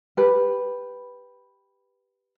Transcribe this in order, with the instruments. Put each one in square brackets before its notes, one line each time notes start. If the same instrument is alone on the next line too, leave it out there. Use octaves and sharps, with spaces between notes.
[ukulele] G4 B4